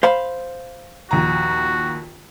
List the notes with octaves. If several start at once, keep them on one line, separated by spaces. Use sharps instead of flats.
C5 F5 B5
A#1 D#2 F#4 A#5